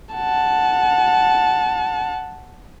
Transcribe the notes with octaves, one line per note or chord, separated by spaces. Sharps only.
F#5 A5